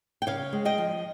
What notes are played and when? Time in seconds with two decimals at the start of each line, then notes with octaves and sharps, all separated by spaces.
0.22 G5
0.27 C#3 C#5 F5
0.53 G#3
0.65 D#5 G5
0.78 F3